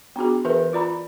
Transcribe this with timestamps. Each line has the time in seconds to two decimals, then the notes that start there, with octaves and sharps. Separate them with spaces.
0.16 B3 D4 F#4 G#4
0.45 E3 G#4 A#4 B4 E5
0.73 F4 D5 A#5 B5